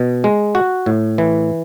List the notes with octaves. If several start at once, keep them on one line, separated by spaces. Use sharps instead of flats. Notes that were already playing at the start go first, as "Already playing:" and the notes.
Already playing: B2
G#3
F#4
A2
E3